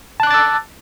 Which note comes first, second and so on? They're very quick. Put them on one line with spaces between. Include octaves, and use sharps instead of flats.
A5 F#6 D6 A6 E6